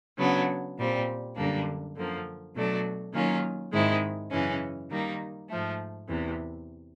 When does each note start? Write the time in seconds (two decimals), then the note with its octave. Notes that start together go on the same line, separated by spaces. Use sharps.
0.18 C#3 F#3 B3 D4
0.77 A#2 G3 C4
1.36 F#2 D3 G3 A#3 D4
1.96 F#2 D3 F3 A#3
2.55 B2 F#3 A3 D4 F#4
3.13 D#3 F#3 A#3 C#4 F4
3.72 G#2 D#3 G#3 C4 E4
4.31 F#2 C#3 E3 G#3 C#4
4.90 D#3 G3 A#3 D#4
5.49 G#2 F3 A3
6.08 E2 C3 E3